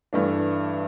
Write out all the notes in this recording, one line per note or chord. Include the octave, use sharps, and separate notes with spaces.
G2 E3 A3 D4